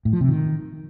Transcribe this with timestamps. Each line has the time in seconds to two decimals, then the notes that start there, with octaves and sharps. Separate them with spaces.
0.05 A2
0.13 F3
0.21 C3
0.28 D#3